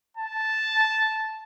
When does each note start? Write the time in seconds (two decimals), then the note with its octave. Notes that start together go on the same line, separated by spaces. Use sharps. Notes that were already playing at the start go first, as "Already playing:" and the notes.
0.17 A5